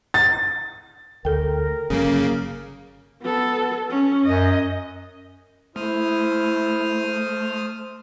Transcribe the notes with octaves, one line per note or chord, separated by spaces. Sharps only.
A6
D2 A4 A#4 G5
G1 C#3 F#3 A#3
B3 A4
C#4
F#2 D#5
A3 E4 C5 D#6 F6